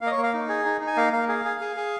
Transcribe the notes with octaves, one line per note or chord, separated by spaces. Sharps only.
A#3 F5
D#5
C#5
A#3
F5
D#4
G#4
D#4
D#4
G#5
A#3 F5
A#3 F5
G#4 F5
G#4
G#4
G#4